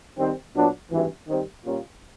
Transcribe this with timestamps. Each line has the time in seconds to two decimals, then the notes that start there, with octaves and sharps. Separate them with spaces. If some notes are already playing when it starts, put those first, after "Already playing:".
0.18 D#3 G3 C4
0.55 A#2 F#3 B3 D4
0.92 G#1 G2 E3
1.29 D#3 G3 C4
1.65 A#2 G3 A#3 C#4 F4